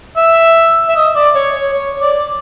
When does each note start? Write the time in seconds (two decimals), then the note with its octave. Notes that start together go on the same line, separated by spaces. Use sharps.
0.16 E5
0.89 E5
0.96 D#5
1.16 D5
1.35 C#5
1.55 C#5
1.74 C#5
2.01 D5